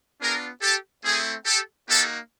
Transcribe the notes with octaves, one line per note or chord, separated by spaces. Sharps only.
B3 D4 F4 G#4 A#4
G4 A4
A3 C4 E4 G#4
G4 A4
A#3 D#4 F#4 G4 A4